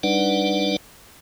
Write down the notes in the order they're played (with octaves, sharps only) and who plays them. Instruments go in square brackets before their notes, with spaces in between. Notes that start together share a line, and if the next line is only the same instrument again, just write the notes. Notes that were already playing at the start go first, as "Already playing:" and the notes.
[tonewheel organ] G3 D4 D#4 B4 D5 F#5